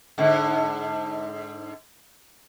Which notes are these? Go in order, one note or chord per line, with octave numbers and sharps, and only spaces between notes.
G#2 D3